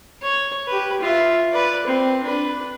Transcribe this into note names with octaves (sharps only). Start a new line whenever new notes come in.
C#5
G4 B4
F4 E5
B4 D5
C4
D4 B4